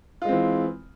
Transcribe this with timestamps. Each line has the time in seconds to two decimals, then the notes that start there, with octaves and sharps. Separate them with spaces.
0.22 F4
0.25 G#3
0.29 C4
0.32 E3